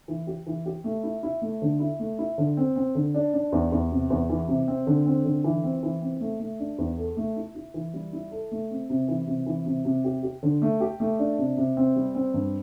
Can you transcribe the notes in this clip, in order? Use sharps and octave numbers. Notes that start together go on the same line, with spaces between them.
E3
G4
E3
G4
A3
E4
E4
A3
D3
E4
A3
E4
D3
C4
C4
D3
D4
D4
E2
E2
C3
E2
E3
C3
C4
D3
C4
D3
E3
C4
E3
C4
A3
A3
D4
E2
A4
A3
E4
E4
E3
G3
E4
A4
A3
C4
C3
E3
C3
E3
C3
C3
G4
G4
D3
A3
G4
A3
D4
C3
C3
C4
G3
C4
G2